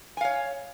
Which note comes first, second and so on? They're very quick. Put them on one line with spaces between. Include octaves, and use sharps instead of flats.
G#5 F5 C#5